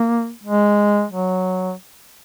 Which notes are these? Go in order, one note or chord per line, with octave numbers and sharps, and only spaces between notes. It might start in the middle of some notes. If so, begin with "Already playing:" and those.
Already playing: A#3
G#3
F#3